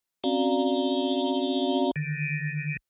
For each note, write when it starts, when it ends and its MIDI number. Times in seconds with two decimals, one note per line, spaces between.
0.24 1.91 60
0.24 1.91 61
0.24 1.91 66
0.24 1.91 74
0.24 1.91 77
0.24 1.91 82
1.96 2.77 50
1.96 2.77 51